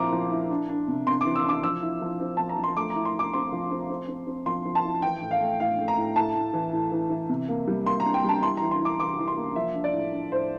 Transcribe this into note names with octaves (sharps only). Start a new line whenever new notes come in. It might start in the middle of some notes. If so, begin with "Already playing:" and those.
Already playing: A#2 F3 C4 E4 A#5 C6 D6
F3
E4
D4
D4
C3
C3 C6
E3 D6
E6
D4 D6
F3 E6
E4
F3
C4
F3 A5
A#5
F3
C6
A3 D6
A#5
E4
C6
E4 D6
C4 C6
F3
C4
C4
C4
C4
F3 C6
F3
A5
E4
E3 G5
A2
F5
A3
A2 F5
A3
A#5
A2
A2 A5
A2
E3
A2
E3
E3
C3
A#3
G3
A#3 C6
D4 A#5
G5
G3 A5
E4 C6
E3 A#5
C6
E4 D6
E3 D6
E3
C6
A#3
F3 E5
D4
D5
A2
D4
A2 C5